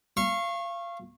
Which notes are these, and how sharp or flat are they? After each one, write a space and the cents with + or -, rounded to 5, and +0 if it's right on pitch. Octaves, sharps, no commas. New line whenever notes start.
F5 -25 C#6 -25